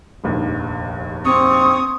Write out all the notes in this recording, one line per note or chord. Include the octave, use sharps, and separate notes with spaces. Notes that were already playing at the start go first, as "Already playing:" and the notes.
F1 A#1 D#2
C4 C#6 D#6